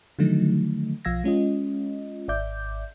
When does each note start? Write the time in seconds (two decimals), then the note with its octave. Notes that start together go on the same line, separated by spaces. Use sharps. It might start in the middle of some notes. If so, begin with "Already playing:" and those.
0.19 D3 D#3 F3 F#3 A3 D#4
1.05 B1 F3 F5 E6 G#6 A#6
1.24 G#3 C#4 F4 D#5
2.28 G#1 D5 E5 D6 G6